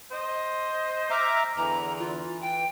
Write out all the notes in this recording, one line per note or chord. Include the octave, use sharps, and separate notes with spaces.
C5 D#5
E5 A#5 D6 F6
E2 D3 E3 A#5
F4
G5